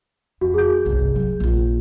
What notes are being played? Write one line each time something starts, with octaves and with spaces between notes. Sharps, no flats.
F2 F#4
G#4 G6
G1 C2
F#3 G3
A#1 F4